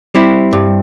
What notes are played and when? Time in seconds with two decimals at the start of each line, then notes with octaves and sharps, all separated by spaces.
0.15 G3 C4 E4
0.53 G2